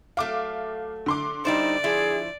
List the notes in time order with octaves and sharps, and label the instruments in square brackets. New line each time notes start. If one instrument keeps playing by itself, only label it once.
[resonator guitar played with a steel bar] F#3 A3 [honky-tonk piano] F5 D6
[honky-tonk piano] D3 C6 D6
[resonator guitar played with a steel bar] G3 E4 C5 [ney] D#4 [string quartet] D5
[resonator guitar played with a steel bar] F3 E4 [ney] G#4